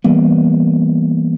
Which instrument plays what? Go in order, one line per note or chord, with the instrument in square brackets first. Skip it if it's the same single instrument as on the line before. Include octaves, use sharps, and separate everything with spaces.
[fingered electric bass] E3 G3 A#3 B3